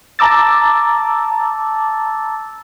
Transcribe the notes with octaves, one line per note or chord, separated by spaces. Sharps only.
A5 A#5 D6 E6 A6